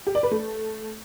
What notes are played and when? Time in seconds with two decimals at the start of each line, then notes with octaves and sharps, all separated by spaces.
0.07 G4
0.15 D5
0.23 B4
0.31 A3